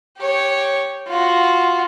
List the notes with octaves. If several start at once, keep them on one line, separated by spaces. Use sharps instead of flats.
G4 C#5
F4 F#4